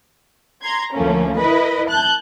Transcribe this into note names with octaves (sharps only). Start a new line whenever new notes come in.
A#5 C6 G#6
D2 F3 A3 A#3 C#4
E4 A#4 B4 D#5 B5
A5 F#6 G6